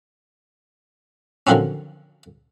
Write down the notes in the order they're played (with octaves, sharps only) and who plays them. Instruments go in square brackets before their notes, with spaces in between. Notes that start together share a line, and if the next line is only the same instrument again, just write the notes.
[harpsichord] D3 D#3 F3 F#3 C4 C#4